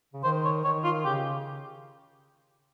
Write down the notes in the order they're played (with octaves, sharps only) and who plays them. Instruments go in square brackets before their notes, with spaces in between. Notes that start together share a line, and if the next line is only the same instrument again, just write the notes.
[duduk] C#3
[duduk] D#3 [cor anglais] C5
[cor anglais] C#5
[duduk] D#3 [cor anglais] C#5
[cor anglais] F4
[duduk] C#3 [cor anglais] G4